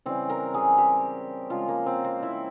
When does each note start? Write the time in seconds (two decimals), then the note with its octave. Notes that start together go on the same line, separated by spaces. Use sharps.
0.06 C#3 E3 G3 C4
0.29 A#4
0.54 G#4
0.78 G4
1.50 C#3 F3 G#3 F4
1.68 A#3
1.86 C4
2.04 C4
2.23 E4